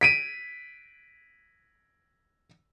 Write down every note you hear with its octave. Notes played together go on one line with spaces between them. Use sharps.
B6 D7 D#7